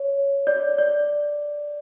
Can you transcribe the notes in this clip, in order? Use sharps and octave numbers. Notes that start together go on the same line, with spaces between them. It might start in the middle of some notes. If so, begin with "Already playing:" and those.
Already playing: C#5
D5
D5